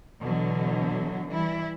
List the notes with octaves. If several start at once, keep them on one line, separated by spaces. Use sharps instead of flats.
B2 D3 E3 F#3
E3 G3 E4